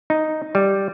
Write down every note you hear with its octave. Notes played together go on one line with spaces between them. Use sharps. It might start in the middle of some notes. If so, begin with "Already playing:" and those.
D#4
G3